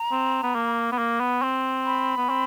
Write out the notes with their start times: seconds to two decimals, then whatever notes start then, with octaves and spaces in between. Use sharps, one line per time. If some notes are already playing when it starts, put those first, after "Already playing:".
Already playing: A#5
0.11 C4
0.43 B3
0.55 A#3
0.92 B3
0.98 A#3
1.20 B3
1.42 C4
1.86 B5
2.17 B3
2.29 C4